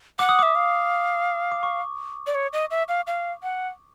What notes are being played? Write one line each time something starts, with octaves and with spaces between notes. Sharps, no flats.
F#5 D6
D#6
E5 D6
F5
D6
C#6
D5
C#5
D#5
E5
F5
F5
F#5